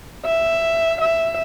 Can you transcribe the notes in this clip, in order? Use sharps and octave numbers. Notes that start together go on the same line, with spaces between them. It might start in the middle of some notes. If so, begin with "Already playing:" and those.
E5
E5